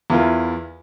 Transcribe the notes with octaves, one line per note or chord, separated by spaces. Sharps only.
E2 E4 F4 A#4